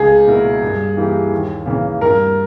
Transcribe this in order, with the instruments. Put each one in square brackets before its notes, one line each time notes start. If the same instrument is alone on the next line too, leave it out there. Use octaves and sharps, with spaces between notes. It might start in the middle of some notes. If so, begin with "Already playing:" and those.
Already playing: [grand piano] C#2 [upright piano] G#4
[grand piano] B2 A#3 E4 A#4
G2
E3 A#3 E4 G4
D#2
C#3 E3 A#3
[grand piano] G2 [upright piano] A#4